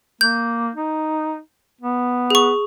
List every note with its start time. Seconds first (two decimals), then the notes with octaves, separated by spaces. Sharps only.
0.21 A#3 G6
0.75 D#4
1.81 B3
2.30 G#4 C#6